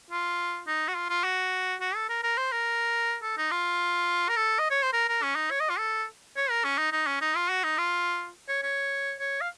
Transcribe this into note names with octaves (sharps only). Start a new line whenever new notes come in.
F4
D#4
F#4
F4
F4
F#4
F#4
A4
A#4
A#4
C5
A#4
A4
D#4
F4
A#4
A4
D#5
C#5
C5
A#4
A#4
C#4
D#4
C#5
D#5
F4
A4
C#5
A#4
C#4
D#4
D#4
C#4
D#4
F4
F#4
D#4
F4
C#5
C#5
C#5
F5